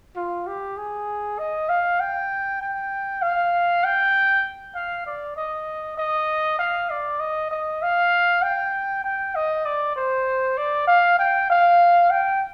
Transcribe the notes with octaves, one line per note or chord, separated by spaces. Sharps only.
F4
G4
G#4
D#5
F5
G5
G5
F5
G5
F5
D5
D#5
D#5
F5
D5
D#5
D#5
F5
G5
G5
D#5
D5
C5
D5
F5
G5
F5
G5